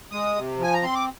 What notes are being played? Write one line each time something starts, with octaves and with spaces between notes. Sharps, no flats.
G#3 D#6
C3
F3
G#5
A#5
C4 C6
D6